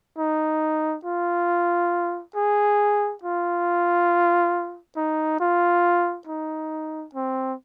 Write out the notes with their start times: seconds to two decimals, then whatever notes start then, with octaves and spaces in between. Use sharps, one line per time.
0.18 D#4
1.05 F4
2.36 G#4
3.23 F4
4.97 D#4
5.40 F4
6.27 D#4
7.15 C4